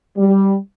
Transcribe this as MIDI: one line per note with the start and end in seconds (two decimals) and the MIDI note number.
0.18 0.56 55